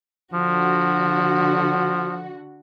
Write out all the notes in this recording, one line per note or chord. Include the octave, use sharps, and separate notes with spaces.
D3 F3 F#4